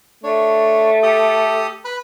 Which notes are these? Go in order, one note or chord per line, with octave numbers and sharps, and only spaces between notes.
A3 D4 C#5
G4 A4 D#6
B4 B5